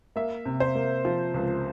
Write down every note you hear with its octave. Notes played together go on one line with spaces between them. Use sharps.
A#3 E5
C3
C5
A#3
F3
C#2